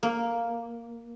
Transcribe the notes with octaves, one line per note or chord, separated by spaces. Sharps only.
A#3